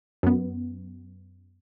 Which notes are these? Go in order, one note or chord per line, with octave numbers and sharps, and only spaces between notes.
F#2 B3